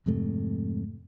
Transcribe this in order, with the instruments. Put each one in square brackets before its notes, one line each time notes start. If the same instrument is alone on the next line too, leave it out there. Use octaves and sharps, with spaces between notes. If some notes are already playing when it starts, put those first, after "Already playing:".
[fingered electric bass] F2 G#2 C3 A3